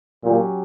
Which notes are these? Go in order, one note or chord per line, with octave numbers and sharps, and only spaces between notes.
A#2 F#3 C#4 G4